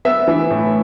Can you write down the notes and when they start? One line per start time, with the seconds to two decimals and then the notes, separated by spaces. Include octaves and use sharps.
0.05 B3 E5
0.28 E3
0.50 A2